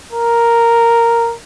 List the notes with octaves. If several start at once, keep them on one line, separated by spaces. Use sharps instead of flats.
A#4